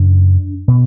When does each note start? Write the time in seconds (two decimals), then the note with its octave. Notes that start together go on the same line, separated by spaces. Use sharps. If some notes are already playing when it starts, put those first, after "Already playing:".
Already playing: F#2 C#3 D4
0.68 B2